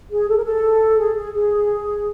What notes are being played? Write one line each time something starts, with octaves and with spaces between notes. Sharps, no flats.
G#4
A4
A#4
A4
G#4
G#4
G#4